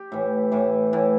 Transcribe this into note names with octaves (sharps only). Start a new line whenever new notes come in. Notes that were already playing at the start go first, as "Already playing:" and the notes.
Already playing: G4
A2 E3
A2 E3
A2 E3